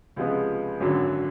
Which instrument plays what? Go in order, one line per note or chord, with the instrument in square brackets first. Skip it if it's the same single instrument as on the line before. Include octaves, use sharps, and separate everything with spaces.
[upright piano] C#2 C3 F3 G#3 B3
G#1 F#2 D3 F#3